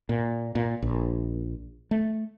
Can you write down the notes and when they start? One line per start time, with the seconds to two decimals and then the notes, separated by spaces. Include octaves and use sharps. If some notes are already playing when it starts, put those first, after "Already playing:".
0.09 A#2
0.55 A#2
0.82 A#1
1.91 A3